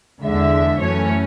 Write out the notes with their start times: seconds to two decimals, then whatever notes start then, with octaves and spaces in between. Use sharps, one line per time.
0.23 E2 D3 G#3 E5
0.79 F#2 E3 A3 C#4 C#5